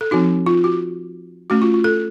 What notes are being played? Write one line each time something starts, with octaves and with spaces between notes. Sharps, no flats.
A4
F3 C4 D#4 F#4
F4
F#4
A3 C#4 F#4
F4
F4
A4